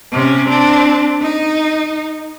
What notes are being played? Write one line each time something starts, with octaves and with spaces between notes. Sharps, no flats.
C3 C#4
C4 D4
D#4